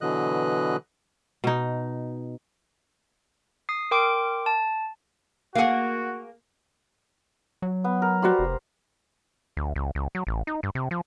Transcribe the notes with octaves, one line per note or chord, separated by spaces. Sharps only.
B2 D3 E3 F#3 D#5 F#6
B2 D#4
D#6 C7
A#4 G5 C6 D6 D7
A5
A#3 F#4 G#4 F5 F#5
F#3
B3
A#4
F#4 G4 C5 D5 B5
F1
D2
C#2
C#2
F#3
A1
D#4
G2
C3
F3